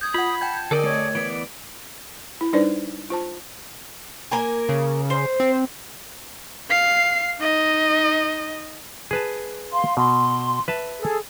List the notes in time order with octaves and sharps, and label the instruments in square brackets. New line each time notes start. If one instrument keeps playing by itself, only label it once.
[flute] D#6 [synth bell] G6 G#6
[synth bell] F4 F#5 [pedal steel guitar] B5
[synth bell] G5 G6 G#6 [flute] A5
[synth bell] D3 A#4 [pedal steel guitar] A4 D5 D#5
[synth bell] A3 [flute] C#5
[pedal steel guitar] E3 B3 D5 [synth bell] D7
[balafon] E4
G3 D4 D#4 B4 C5 D5
F4 C5 A5
[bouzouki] A#3 A#4 G#5
[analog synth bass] C#3
[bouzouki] C5
[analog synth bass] C4
[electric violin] F5 C7
D#4 D#5
[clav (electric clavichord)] G#4 B4 A5
[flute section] F5 C6
[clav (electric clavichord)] B2 [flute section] C6
[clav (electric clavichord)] B4 E5 A5
[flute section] G#4 A4